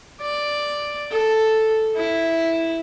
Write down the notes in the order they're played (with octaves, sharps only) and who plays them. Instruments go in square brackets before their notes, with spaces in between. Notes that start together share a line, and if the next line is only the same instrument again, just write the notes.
[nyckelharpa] D5
A4
E4